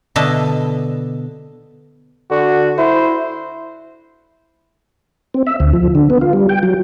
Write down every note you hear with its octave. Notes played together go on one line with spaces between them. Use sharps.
B2 D3 D4 D#5 E5 A5
D3 F#4
E4 C5
C4
E5
D2
F3
D3
B3
F4
G3
G5
F#3